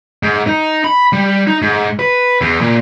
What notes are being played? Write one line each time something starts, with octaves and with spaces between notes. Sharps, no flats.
G#2
D#4
B5
G3
D#4
G#2
B4
E2
A#2